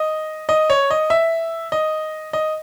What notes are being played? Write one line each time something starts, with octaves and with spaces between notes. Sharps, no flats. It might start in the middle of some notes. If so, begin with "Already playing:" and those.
Already playing: D#5
D#5
C#5
D#5
E5
D#5
D#5